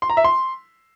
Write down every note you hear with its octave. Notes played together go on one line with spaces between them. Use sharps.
C6
A#5
E5
C6